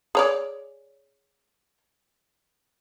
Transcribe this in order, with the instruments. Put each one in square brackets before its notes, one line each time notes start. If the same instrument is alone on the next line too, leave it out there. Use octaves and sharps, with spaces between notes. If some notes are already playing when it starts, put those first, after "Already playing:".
[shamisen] G#4 C#5 D5